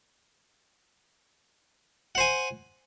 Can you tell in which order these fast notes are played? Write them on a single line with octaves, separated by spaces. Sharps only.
F#5 C5 G#5